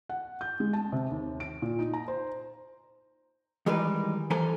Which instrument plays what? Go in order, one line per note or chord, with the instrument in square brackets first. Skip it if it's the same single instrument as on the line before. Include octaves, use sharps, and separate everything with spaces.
[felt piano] F#5
G6
G#3
A5
C3
D#2
D7
A#2
D#4
A#5
C5
[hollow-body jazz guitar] D#3 E3 G3 G#3 A#4 B4
E3 A4 A#4 C5 G#5